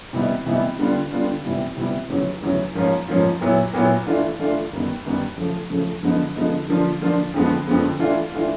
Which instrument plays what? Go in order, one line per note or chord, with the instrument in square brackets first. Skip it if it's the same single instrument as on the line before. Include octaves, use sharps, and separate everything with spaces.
[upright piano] C3 E3 G3 B3 D#4
C3 E3 G3 B3 D#4
D3 G3 B3 D4 F4
D3 G3 B3 D4 F4
C3 E3 G3 B3
C3 E3 G3 B3
E2 C#3 F#3
E2 C#3 F#3
G#2 F3 A#3 C#4 F4
G#2 F3 A#3 C#4 F4
A#2 F#3 B3 E4
A#2 F#3 B3 E4
E3 A3 D4 F4
E3 A3 D4 F4
F#2 D#3 G3 B3
F#2 D#3 G3 B3
C#3 F3 A3
C#3 F3 A3
D3 F3 G#3 B3 D#4
D3 F3 G#3 B3 D#4
D3 F3 A#3 D4 F4
D3 F3 A#3 D4 F4
F2 D3 F3 G#3 B3
F2 D3 F3 G#3 B3
E3 A3 D4 F4
E3 A3 D4 F4